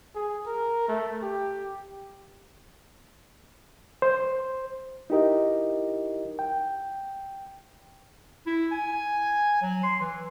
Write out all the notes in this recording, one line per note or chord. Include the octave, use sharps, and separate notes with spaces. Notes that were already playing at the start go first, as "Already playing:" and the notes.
G#4
A#4
A3
G4
C5
D#4 E4 G4 A#4 D#5
G5
E4
G#5
F#3
C6
E3